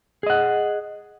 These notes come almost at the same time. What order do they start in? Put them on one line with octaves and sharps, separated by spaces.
G#4 D#5 F#5